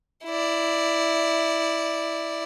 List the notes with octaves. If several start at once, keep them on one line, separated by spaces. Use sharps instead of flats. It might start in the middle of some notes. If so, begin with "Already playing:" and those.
E4 D5